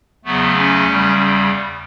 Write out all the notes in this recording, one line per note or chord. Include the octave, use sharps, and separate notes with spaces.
E2 C#3 F#3 A3 B3
C#4
E2 C#3 G3